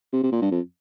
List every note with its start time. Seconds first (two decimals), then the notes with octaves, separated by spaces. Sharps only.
0.13 C3
0.23 C3
0.32 A#2
0.42 G2
0.51 F2